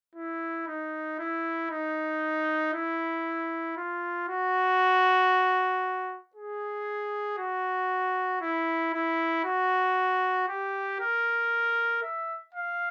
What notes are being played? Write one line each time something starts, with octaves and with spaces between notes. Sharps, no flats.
E4
D#4
E4
D#4
E4
F4
F#4
G#4
F#4
E4
E4
F#4
G4
A#4
E5
F5